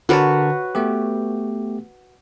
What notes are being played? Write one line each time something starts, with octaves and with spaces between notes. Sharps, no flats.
D3 F#4 A#4 B4 C#5 A5
A3 B3 G4